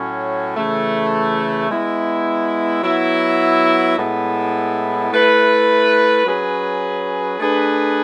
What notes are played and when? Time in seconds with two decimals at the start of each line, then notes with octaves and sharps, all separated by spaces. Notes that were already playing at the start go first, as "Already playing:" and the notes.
Already playing: A2 F#3 C#4
0.56 C#3 E3 A3
1.70 G#3 B3 E4
2.84 F#3 B3 E4
3.98 A2 G#3 B3 E4
5.12 A3 E4 B4
6.26 F#3 C#4 G#4 B4
7.40 A3 D4 G#4 B4